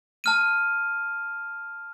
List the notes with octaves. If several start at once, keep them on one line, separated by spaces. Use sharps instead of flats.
A5 F6 D#7